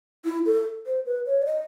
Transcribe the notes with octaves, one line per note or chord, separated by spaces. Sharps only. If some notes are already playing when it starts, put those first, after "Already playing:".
E4
A4
C5
B4
C#5
D5
D#5